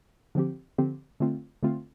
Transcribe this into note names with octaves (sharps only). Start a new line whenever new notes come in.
D3 F3 C4 G4
D3 F3 C4 G4
D3 A3 C4 F4
D3 A3 C4 F4